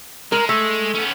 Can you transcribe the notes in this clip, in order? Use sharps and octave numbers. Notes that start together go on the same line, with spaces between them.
G#3 A#4
A3
B3 C#4